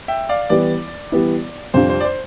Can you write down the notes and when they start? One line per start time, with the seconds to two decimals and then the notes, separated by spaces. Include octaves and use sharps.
0.08 E5 G5
0.29 D5 F5
0.50 E3 G3 B3 E4 D5
1.12 E3 G3 B3 E4
1.74 F2 C3 G3 D4 F4 C5
1.90 C5
2.00 D5
2.05 C5